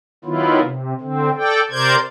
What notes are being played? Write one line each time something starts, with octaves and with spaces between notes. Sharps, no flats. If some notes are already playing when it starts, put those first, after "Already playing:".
D#3 F#3 B3 E4 F4
C3
D3 C4
A4 D5 G5
C3 A#4 C5 D5 G6 G#6